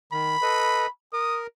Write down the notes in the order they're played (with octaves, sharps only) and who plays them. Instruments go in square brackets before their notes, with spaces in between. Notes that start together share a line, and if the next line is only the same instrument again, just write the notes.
[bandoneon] D#3 [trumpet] B5
[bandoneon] A4 B4 D#5
[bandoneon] A#4 [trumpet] D#6